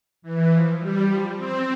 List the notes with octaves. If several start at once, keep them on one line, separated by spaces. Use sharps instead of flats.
E3
F3
G3
F3
C4